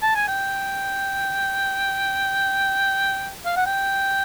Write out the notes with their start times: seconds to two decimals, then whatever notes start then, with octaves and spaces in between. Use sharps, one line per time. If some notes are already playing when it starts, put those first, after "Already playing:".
0.03 A5
0.16 G#5
0.28 G5
3.46 F5
3.57 F#5
3.67 G5